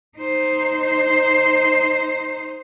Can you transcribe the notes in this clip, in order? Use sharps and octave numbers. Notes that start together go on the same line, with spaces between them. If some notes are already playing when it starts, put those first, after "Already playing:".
D#4 C5